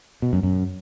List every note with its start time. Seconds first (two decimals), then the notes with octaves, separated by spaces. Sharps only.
0.22 B2
0.33 F#2
0.43 F#2